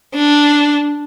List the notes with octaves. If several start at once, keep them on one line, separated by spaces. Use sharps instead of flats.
D4